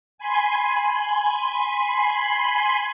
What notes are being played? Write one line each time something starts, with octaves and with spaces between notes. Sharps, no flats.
G#5 B5 C6